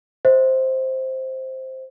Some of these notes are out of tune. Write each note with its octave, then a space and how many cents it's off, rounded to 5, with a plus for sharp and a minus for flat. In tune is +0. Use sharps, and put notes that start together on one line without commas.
C5 +0 E5 -45